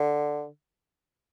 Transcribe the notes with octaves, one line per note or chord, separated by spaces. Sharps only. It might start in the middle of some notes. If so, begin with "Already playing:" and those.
Already playing: D3